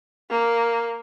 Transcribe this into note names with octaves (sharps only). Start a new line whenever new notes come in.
A#3